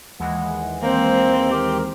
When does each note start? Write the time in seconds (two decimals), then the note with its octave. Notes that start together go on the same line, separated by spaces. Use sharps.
0.20 D#2 E3 G#3 F#5
0.82 A#3 C4 C5
1.51 G4 A#4